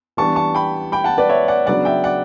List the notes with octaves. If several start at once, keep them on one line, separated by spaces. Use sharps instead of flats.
E3 G3 B3 D4 A5 C#6
A5 C#6
G5 B5
G5 B5
F#5 A5
B4 D5
C#5 E5
D5 F#5
C#3 F#3 B3 D4 D5 F#5
E5 G5
D5 F#5